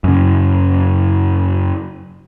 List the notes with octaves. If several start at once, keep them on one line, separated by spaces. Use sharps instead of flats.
F#2 C#3